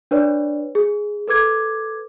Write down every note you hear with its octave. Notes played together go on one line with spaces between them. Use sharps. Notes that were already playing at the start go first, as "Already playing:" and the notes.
D4 B4 C#5 D5
G#4
A4 B4 D6 G#6